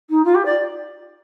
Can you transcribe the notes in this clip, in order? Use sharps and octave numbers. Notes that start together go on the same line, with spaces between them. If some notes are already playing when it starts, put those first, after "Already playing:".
D#4
F4
G4
D5